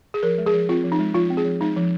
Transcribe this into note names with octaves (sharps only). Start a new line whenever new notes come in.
G#4
F3 A#4
G#3
G#4
F3
C4 F4
F3
D#4
G#3
F3 F4
C4
G#4
F3
G#3 D#4
F3